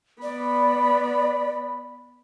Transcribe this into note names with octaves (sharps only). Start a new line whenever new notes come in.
B3 D5 B5